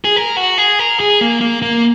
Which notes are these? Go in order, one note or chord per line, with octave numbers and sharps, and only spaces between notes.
G#4
A#4
F#4
G#4
A#4
G#4
A#3
A#3
A#3